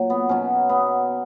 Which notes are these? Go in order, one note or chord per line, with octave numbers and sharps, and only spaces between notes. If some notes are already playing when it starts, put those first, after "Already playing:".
Already playing: A#2 F#3
B3
B2 F#3 C#4
B3